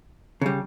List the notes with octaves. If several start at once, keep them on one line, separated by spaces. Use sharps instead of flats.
C#3 G3